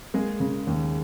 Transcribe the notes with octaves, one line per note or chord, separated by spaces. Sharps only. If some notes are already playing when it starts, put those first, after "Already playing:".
G#3 A#3 G#4
C#3
D#2